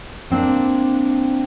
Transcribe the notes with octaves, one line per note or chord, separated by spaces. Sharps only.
A#3 C4 D4